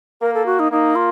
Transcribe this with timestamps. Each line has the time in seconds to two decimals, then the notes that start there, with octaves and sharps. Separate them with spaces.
0.22 A#3 A#4
0.34 A4
0.46 F#4
0.59 D#4
0.71 A#3 D#4
0.96 F4